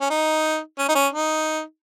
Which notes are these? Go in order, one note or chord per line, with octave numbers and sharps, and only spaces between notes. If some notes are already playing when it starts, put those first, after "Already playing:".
C#4
D#4
C#4
D#4
C#4
D#4